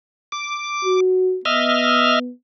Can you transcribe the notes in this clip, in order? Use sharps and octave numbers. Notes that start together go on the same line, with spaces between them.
D6
F#4
B3 D#5 E5 F6